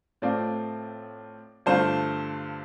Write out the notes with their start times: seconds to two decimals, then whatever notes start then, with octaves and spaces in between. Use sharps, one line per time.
0.22 A2 A3 C4 F4 D5
1.66 G2 D3 A3 F4 C5